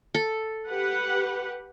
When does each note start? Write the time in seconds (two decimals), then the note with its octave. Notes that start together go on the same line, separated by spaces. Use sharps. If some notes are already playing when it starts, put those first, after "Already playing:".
0.15 A4
0.68 G4 B4 F#5